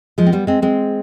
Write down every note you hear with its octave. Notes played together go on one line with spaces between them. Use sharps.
F3 G#3
C4
G3 B3
G#3 C4
G#3 C4